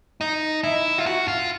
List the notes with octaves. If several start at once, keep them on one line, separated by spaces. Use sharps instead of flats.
D#4
E4
F4
F#4
F4